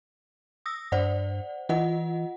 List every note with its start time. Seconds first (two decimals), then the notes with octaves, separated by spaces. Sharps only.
0.66 D#6 E6 A#6
0.92 G2 C5 D5 F#5
1.69 E3 F4 D#5 F#5